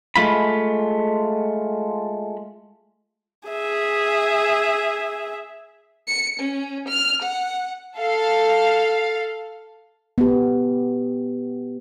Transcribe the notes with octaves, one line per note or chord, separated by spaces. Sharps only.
G#3 A3 F4 B5
G#4 E5
C#7
C#4
F6
F#5
A4 F5
B3 G4